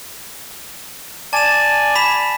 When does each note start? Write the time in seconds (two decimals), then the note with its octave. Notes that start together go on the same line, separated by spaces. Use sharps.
1.33 D5 G#5 A5 E7
1.95 B5 B6 E7